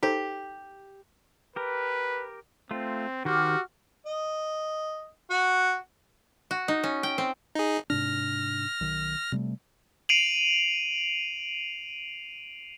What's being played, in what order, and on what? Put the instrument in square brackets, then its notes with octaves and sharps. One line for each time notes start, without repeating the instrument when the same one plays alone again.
[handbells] D#4 A4 C5 [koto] G4
[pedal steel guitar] G4 A#4 [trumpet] B4
[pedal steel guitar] A3 F4 [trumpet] C4
[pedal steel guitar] D#3 C5 [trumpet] F#4 [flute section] G4 D6 F6
[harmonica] D#5
F#4
[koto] F#4
D#4
C#4
G5
C4
[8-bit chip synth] D#4 G#4
[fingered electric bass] G#2 C3 D4 [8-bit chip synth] F6 A#6
[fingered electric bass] B1 D#3
C3 G3 A3
[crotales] C7 D7 D#7 F7 F#7